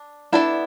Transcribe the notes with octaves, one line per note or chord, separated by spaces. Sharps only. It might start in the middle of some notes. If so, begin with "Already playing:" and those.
Already playing: D4
B3 D4 E4 A4 D5